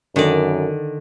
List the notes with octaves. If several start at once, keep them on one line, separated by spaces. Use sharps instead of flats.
F#2 D3 D#3 D5